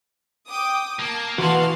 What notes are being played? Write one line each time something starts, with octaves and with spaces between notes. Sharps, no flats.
G5 D6 D#6
A#3 A5
E3 F#4 B4 F5 F#5 A5 C6